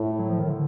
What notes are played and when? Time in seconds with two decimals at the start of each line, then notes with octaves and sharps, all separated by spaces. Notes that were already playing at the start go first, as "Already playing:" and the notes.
Already playing: A2
0.19 F#3
0.29 F3
0.39 D#3
0.49 D3